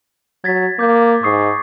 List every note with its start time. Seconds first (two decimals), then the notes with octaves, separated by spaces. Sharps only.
0.44 F#3 G#6 A6 B6
0.79 A#3 D6 G6
1.23 G#2 C#6 D#6 C7